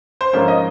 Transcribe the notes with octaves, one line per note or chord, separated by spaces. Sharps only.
C5
G#2 F3 A#3 C#4 F4 C#5
D#5